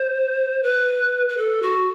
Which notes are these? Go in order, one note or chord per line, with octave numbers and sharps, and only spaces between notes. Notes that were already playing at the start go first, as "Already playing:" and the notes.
Already playing: C5
B4
B4
A4
F#4